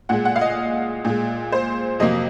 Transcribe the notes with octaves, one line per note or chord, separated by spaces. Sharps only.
A#2 G#3 F#5
F#5
F5
D#5
A#2 G#3
C5
F2 C3 F#3 A#3 D#5